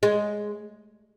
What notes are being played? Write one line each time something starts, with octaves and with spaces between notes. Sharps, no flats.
G#3